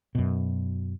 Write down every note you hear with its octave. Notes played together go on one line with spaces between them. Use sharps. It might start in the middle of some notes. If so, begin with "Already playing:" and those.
F#2 B2